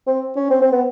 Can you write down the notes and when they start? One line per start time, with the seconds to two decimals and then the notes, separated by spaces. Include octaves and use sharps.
0.07 C4
0.36 C#4
0.50 C4
0.62 C4
0.72 B3